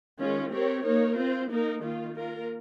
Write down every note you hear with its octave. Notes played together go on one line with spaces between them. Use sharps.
D#3 G#3 C#4 F4
C4 G4 A#4 C#5
A#3 D#4 A#4 C#5
C4 F4 C5
A#3 D#4 A#4
D#3 A#3 F4
A#3 F4 A#4